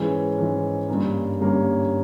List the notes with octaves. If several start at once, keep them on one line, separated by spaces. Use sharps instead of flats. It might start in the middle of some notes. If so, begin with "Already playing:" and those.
Already playing: G#2 E3 G#3 C#4
G#2 E3 G#3 C#4
G2 D3 G3 A#3 C#4
G2 D3 G3 A#3 C#4